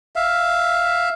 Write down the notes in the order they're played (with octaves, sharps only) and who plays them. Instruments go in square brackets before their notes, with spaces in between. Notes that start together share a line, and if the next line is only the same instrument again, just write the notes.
[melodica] E5 F5